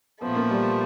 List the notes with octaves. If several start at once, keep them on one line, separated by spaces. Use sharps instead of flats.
A#2 F3 A3 B3
A#3
G3